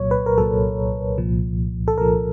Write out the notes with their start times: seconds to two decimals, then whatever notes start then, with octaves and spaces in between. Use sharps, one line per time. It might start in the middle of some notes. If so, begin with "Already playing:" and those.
Already playing: C2 A#2 F#3 C#5
0.11 B4
0.26 A#4
0.38 C2 A#2 F#3 A4
1.18 C2 A#2 F3
1.88 A4
1.97 C2 A#2 F3 A#4